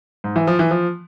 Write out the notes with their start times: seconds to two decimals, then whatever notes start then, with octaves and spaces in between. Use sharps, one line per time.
0.24 G#2
0.36 E3
0.47 F3
0.59 E3
0.71 F3